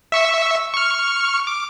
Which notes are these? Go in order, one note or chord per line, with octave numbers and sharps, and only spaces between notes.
E5 C#6 E6
C#6 F6
D6